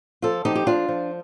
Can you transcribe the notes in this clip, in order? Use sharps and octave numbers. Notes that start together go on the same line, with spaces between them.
F3 F4 A4
F3 D#4 G4
G4
F3 D4 F4
F3